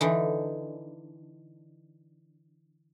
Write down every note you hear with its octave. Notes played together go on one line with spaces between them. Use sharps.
D3 E3 D#4